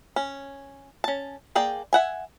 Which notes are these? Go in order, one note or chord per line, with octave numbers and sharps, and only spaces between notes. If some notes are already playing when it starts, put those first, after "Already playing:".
C#4
C#4 A5
A#3 G#4 D5 G5
E5 F#5 G#5